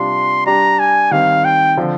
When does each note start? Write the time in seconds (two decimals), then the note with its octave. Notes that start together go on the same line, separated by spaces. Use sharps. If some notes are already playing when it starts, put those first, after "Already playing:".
Already playing: C3 G3 D4 F4 C6
0.46 G3 D4 G4 A#5
0.79 G#5
1.11 D#3 G3 C4 F5
1.45 G5
1.77 D3 F3 C4 F4